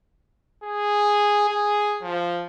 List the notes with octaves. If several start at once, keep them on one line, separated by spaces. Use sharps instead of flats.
G#4
G#4
F3